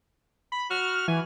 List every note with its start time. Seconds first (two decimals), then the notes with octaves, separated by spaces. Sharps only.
0.52 B5
0.70 F#4 F6
1.08 E3 G#5